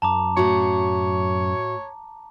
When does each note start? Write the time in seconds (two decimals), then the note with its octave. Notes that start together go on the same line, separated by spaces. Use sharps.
0.02 F#2 A5 A#5 D6
0.37 A2 F#4 C#5